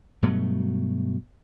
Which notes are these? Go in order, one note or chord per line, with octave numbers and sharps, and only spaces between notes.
G2 B2 F#3 A3